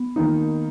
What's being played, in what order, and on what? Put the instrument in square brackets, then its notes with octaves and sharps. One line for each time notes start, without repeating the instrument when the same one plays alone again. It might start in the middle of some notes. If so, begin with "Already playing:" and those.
Already playing: [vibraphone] B3
[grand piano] D#3 A#3 D#4